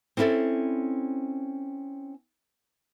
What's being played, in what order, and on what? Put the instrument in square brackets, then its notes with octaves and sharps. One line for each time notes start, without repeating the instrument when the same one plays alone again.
[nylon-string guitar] C4 C#4 E4 F#4 A4 D5